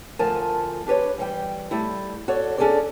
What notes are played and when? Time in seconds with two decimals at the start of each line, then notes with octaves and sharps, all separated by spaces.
0.19 D2 F3 A#4 G#5 A5
0.86 D4 G4 B4 C#5
1.18 E3 G3 G5
1.71 G3 A3 E4
2.28 F#4 A4 C#5 D5
2.58 C#4 D4 G#4 A4 D5